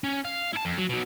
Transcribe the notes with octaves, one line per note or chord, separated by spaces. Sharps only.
C#4
F5
E4 A5
F2
F#3
B2 F#3